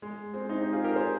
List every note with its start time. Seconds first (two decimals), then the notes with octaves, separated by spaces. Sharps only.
0.02 G#3
0.33 G#3 C4
0.49 C4 D#4
0.61 D#4 G4
0.73 F4 G#4
0.84 G4 A#4
0.96 G#4 C5